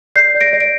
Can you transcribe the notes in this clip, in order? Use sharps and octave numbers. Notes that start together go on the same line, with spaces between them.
D5 G6 C7
D5
A#6 D7
D5
D7